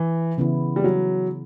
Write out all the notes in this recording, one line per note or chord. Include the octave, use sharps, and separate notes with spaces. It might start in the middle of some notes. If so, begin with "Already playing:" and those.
Already playing: E3
C#3 E3 B3 E4
G3
F#3